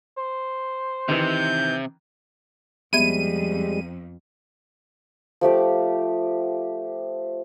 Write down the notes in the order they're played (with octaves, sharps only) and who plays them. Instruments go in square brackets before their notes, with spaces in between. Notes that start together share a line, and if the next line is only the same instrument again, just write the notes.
[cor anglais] C5
[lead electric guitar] C3 [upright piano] D#3 E3 [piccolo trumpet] G6
[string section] F2 [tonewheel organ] G3 G#3 [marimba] B3 E5 G#6 [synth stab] D#7
[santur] F3 A3 G4 D6